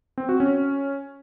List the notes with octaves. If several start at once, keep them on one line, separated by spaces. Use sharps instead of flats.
C4
F#4
C#4